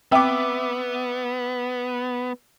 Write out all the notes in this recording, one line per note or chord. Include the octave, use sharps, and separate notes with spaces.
B3 C4 E5 G5 B5 D6